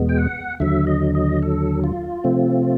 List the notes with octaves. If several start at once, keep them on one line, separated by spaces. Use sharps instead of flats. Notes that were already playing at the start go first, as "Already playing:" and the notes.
Already playing: E2 B2 G#3 B3
G5
F#5
D#2 D3 F#3 E5
D#5
D#5
A4
F4
C3 F3 A3 C4